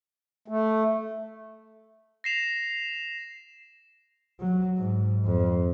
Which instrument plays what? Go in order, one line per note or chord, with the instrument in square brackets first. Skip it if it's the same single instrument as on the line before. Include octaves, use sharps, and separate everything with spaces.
[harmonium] A3
[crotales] A#6 C7 E7 F7
[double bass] F#3
G#2
F2